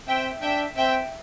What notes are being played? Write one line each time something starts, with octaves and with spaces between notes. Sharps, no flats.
C4 E5 G5
D4 E5 G5
C4 E5 G5